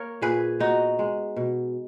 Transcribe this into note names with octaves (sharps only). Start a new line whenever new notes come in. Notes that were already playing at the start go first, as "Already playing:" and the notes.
Already playing: A#3 A#4 C#5
A#2 G#4 B4
B3 D#4 F#4
G#3
B2